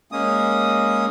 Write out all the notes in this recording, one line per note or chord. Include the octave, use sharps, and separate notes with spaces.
G#3 A#3 C#4 D#6